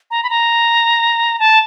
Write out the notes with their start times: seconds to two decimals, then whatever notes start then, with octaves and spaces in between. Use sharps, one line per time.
0.11 A#5
0.23 B5
0.30 A#5
1.39 A5